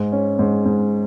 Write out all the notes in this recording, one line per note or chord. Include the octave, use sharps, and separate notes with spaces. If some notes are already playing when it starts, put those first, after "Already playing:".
Already playing: G#2
C#4
G#2
G#2